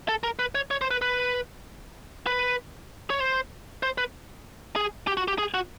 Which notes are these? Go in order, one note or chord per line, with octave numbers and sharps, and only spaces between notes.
A4
A#4
B4
C#5
C#5
C5
B4
B4
B4
C#5
C5
C5
B4
G#4
G4
F#4
G4
G#4
F#4